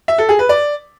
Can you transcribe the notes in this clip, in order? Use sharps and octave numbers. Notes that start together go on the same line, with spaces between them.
E5
A4
G#4
B4
D5